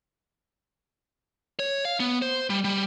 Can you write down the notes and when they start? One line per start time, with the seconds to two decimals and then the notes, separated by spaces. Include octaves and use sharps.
1.59 C#5
1.85 F5
2.00 B3
2.22 C5
2.50 G3
2.65 G3